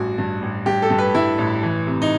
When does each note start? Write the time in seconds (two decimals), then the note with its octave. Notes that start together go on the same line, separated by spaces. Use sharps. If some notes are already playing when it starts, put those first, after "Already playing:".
Already playing: A1 G2 F#4
0.18 G2
0.42 A1
0.66 G2 G4
0.82 A4
0.90 G2
0.98 B4
1.14 G2 E4
1.38 A1
1.63 E3
1.87 C3
2.02 D#4